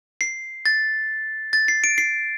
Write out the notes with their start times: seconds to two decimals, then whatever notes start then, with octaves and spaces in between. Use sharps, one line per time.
0.21 C7
0.66 A6
1.53 A6
1.68 C7
1.84 D7
1.98 C7